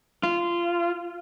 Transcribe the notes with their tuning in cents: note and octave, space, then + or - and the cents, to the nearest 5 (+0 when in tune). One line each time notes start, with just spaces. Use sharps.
F4 -15